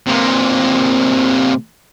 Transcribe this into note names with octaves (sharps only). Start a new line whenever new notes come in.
C3 A#3